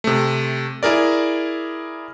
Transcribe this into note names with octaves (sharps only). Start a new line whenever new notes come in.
C3 A3
E4 G#4 A#4 D5